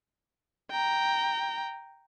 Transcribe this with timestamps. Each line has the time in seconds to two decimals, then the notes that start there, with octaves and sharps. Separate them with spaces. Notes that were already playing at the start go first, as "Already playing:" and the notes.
0.71 G5 A#5